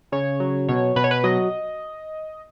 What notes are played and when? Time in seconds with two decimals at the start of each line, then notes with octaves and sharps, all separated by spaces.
0.12 C#3 C#5
0.40 F#3
0.69 B2 C#5
0.96 B2 B4
1.04 C#5
1.11 B4
1.24 F#3 D#5